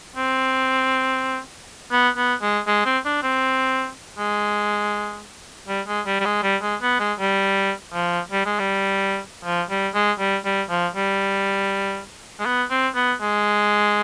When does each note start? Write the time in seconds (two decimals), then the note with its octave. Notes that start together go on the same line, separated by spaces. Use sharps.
0.16 C4
1.92 B3
2.17 B3
2.42 G#3
2.67 G#3
2.85 C4
3.05 D4
3.23 C4
4.18 G#3
5.68 G3
5.88 G#3
6.06 G3
6.20 G3
6.25 G#3
6.43 G3
6.62 G#3
6.82 B3
7.00 G#3
7.19 G3
7.94 F3
8.32 G3
8.46 G#3
8.59 G3
9.45 F3
9.70 G3
9.94 G#3
10.19 G3
10.45 G3
10.70 F3
10.96 G3
12.40 G#3
12.46 B3
12.71 C4
12.96 B3
13.21 G#3